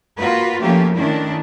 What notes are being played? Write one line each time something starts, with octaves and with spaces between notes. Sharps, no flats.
A#3 F4 F#4 B4
F3 A3 A#3 C#4 G4
D#3 A3 C#4 D4 E4